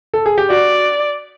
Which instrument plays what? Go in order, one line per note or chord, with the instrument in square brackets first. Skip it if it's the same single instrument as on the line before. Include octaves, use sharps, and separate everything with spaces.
[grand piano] A4
G#4
G4
[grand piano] F#4 [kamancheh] D5